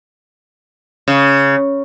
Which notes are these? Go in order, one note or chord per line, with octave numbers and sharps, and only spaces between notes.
C#3